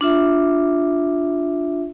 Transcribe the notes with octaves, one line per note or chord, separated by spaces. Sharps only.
D4 F4 E5